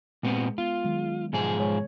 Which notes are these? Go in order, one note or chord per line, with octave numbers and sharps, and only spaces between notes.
A#2 G#3 B3 C4
B3 F4
D#3 F#3 G#3
G#2 B2 F3 G#4
G#3 C#5